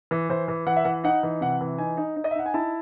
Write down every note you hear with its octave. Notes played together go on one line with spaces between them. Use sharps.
E3
E3 C5
E3
E3 F#5
E5
E3 F#5
D#4 F#5
E3
C3 F#5
E3
D#4 G#5
D#4
D#4
D#5
E5
D#4 F#5
G#5
E4 A5